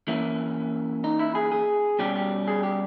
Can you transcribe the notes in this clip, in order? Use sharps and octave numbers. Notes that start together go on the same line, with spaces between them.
E3 A#3 C#4 E4
D#4
E4
G#4
G#4
B2 G3 C#4 G4
G4
G#4
G4